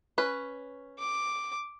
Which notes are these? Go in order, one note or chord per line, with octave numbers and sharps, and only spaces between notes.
C#4 B4
D6